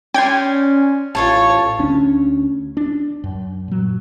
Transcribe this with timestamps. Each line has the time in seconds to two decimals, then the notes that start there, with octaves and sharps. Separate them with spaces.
0.14 C#4 D5 G5 C6 G#6
1.15 A1 F4 A4 C#5 A5
1.79 D2 C#4 D4
2.77 D4
3.24 F#2
3.68 A#2 F#3